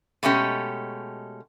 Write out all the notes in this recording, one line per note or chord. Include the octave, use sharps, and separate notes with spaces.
B2 G#3 A3 C#4 G4